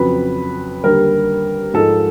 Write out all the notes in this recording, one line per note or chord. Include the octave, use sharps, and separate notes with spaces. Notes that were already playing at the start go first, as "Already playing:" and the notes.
Already playing: F2 C#3 F#3 B4
D#2 D3 G3 A#4
G#2 F3 G#3 A4